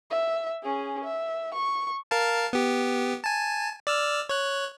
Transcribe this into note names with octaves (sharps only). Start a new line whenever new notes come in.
E5
C#4 G#4
E5
C#6
A#4 F5 A5
B3 G4
G#5 A5
D5 E6 F6
C#5 F#6